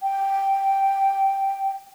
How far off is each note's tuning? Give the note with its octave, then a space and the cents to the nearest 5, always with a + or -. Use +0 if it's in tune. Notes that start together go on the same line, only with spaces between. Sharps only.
G5 -5